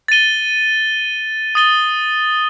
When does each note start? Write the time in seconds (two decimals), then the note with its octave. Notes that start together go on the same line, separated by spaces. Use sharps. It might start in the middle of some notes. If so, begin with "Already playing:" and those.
0.08 A6 D#7 G7
1.55 D#6 A6 D#7 G7